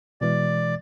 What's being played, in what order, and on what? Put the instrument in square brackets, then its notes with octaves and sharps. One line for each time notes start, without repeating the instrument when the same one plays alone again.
[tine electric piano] B2 E3 G#3 [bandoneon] D5